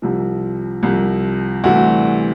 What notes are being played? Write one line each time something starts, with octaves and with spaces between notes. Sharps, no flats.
C2 C3 F3
C2 C3 F3
D2 C3 E3 G3 F#4